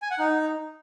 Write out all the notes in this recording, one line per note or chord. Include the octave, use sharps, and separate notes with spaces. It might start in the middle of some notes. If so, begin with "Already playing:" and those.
G#5
F#5
D#4